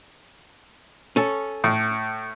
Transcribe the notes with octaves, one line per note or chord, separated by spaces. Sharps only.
C#4 A4
A2